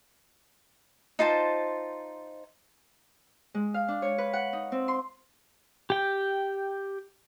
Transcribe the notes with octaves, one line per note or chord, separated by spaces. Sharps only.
D#4 F4 C5 A5
G#3
F5
D4
C#5
B4
F#5
D#4
C4
C6
G4 G5